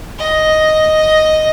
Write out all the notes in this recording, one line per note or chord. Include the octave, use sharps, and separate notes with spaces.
D#5